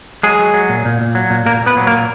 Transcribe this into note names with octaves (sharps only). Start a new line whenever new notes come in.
F#3 G#3 G#4
F#3
F#3
A#2
A#2
A#2
F#3
A#2
A#2 A#3 A#4
A#2
B3 B4
F#3
A#3 A#4
A#2